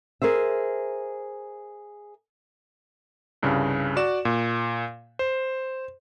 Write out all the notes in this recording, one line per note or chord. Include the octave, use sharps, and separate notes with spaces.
G#4 A#4 C5 E5
C2 G2 C#3
F#4 D5 E7
A#2
C5